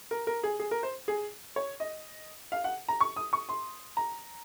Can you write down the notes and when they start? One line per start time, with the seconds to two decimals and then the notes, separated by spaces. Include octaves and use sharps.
0.11 A#4
0.27 A#4
0.43 G#4
0.60 G#4
0.71 A#4
0.83 C5
1.08 G#4
1.56 C#5
1.80 D#5
2.52 F5
2.64 F#5
2.88 A#5
3.01 C#6
3.16 D#6
3.33 C#6
3.49 C6
3.97 A#5